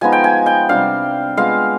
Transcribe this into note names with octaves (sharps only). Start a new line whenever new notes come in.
F3 G#3 B3 D#4 G#5
G5
G#5
G5
C3 G3 D4 F5
G#3 B3 F4 G#4 F5